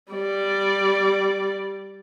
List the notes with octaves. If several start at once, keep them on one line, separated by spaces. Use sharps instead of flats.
G3 D5